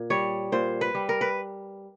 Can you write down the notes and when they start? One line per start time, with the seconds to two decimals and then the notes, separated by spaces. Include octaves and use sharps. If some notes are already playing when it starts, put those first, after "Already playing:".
Already playing: A#2
0.10 G3 C#5
0.52 A#2 C5
0.81 B4
0.95 G3
1.09 A#4
1.21 B4